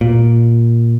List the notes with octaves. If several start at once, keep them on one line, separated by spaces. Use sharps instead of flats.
A#2